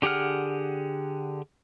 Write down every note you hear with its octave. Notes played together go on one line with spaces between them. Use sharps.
D3 G4 G#4 F#5 F6